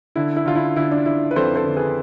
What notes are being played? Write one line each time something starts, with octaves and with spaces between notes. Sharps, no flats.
D3 E4
E4
D3 F4
E4
D3 E4
D4
D3 E4
B4
F2 A4 C5
A4 C5
D3
G#4 B4